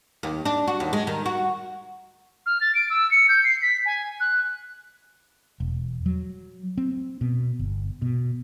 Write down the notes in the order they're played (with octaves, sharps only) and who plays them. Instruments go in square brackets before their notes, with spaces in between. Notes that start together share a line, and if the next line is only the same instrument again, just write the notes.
[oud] D#2
D4
F#4
D#2
G#3
D#3
F#4
[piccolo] F6
A6
D7
E6
C#7
G6
C7
B6
G#5
F#6
[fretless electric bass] E1
F#3
C4
B2
G1
B2